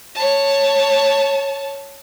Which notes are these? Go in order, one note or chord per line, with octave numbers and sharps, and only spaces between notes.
C#5 A5